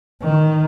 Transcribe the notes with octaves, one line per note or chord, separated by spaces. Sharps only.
D#3